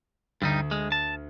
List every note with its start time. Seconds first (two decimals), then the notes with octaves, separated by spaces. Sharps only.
0.42 D2 G2 G3 D#4
0.71 G#3 F6
0.92 A5